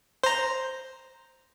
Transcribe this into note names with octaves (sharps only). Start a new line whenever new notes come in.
C5 A#5